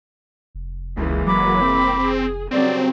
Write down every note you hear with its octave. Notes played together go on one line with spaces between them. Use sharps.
F1
C#2 E3 G#3 A#3
F#3 B5 D6
C4
G#4
G2 C#3 F#3 C4 D5